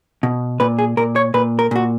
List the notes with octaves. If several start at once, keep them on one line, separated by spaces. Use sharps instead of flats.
B2
A#2 B4
G#4
A#2 A#4
C#5
A#2 B4
A#4
A#2 F#4